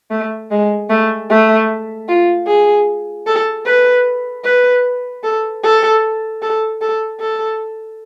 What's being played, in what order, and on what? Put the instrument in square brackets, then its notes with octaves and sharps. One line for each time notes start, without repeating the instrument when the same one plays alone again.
[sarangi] A3
G#3
A3
A3
F4
G#4
A4
B4
B4
A4
A4
A4
A4
A4